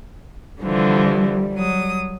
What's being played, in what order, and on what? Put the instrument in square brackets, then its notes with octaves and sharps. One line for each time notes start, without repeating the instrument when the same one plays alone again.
[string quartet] D3 E3 F3 [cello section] G3
[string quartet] F#3 D#6